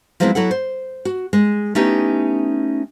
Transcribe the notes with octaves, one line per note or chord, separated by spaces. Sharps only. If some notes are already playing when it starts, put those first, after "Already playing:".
F3 F#3 G#3 B3 C4 E4
F#3 E4 A4 F#5
C5
F#4
G#3
A3 B3 C#4 D#4 E4 G4